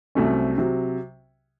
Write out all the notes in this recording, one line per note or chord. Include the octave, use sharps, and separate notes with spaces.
C2 C3 F#3 A3 C#4
C3 F#3